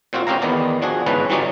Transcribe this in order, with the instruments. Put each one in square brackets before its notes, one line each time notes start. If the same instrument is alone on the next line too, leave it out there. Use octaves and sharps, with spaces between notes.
[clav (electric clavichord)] A#2 C4 F4 F#4
C4 C#4 G4 F5 A#5
E2 D#3 B3 D5
F3 D4 F#4 G#4
G1 G#2 E3 C#4 B4 A5
E3 F#3 G3 C#4 D#4 D5